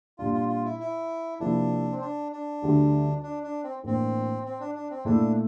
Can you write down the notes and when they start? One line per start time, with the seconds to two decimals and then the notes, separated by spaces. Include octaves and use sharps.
0.19 A#2 G3 D4 F4
0.34 F4
0.49 F4
0.65 E4
0.80 E4
1.40 C3 F3 A#3 D4 E4
1.92 C4
2.01 D4
2.32 D4
2.62 D2 D3 G3
3.23 D4
3.43 D4
3.64 C4
3.83 A2 E3 A#3 C4 D4
4.45 C4
4.60 D4
4.75 D4
4.90 C4
5.05 A#2 A3 D4 E4